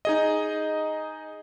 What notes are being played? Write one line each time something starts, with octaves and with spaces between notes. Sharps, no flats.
D#4 G#4 D#5